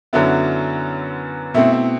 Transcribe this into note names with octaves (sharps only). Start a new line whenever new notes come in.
F#2 D3 F#3 B3 E4
B2 A3 C4 E4
E4